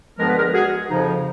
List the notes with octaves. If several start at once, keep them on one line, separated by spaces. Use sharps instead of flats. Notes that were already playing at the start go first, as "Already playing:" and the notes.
G2 D3 F3 G#3 B3 A#4
B4
G#4 A#4
F#4 G#4
F2 C#3 F3 D#4